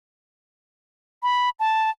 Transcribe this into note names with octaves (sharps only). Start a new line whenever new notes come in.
B5
A5